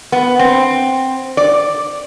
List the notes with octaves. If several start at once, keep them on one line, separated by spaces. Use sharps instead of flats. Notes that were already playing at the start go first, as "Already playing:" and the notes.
B3
C4
D5